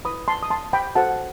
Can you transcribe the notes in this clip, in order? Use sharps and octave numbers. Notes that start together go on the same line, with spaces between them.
E4 B4 B5 D#6
A5 C6
D#6
A5 C6
G5 B5
F#4 A4 C5 F#5 A5